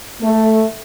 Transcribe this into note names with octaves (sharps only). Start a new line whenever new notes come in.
A3